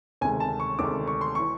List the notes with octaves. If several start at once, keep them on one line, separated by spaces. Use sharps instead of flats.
D2 C3 D#3 G#3 G#5
A5
C#6
D2 C3 D#3 G#3 D6
C#6
C6
E3 C#6